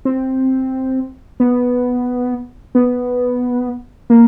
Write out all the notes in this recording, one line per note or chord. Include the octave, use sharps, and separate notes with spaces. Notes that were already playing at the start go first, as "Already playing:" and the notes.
C4
B3
B3
A#3